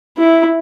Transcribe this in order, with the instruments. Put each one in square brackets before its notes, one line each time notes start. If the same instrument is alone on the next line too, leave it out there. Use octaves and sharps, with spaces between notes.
[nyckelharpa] E4